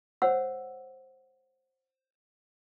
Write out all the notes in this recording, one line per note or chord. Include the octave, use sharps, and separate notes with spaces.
C5 C#5 F#5 E6